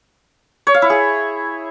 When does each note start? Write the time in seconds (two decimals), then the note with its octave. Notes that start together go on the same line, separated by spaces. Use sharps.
0.67 C#5
0.74 F5
0.82 E4
0.90 G#4